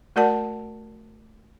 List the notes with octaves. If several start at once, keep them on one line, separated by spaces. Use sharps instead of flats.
A3 F#4 A#4 D5 F#5 A5